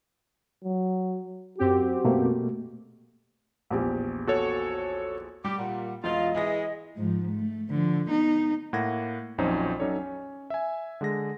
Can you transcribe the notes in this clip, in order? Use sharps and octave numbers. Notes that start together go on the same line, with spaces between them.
F#3
F#2 C4 F#4 G4
B2 A3 A#3
A#1 E2 G4
F#4 A4 C#5
G3 G4
A#2 F#5
E1 F4 D#5
E3 G#3 E4 G#4 A#6
G#2 F3
A3
D3 F3
B3 D#4
A2 A#3 F#5 G#6 A#6
A#1 F2 F#3 C#4 D#4 C5
F#3 C#4 D#4 A4 C#5 D5
C#4
E5 G#5
D3 G#3 G#4 A#6